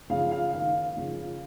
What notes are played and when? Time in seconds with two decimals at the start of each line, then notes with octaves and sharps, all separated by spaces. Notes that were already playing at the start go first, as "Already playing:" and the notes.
0.10 C#3 F3 F5
0.31 F5
0.53 D#2 F5
0.97 C#3 F3